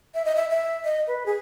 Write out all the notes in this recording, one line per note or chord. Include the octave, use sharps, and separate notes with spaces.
E5
D#5
E5
E5
D#5
B4
G#4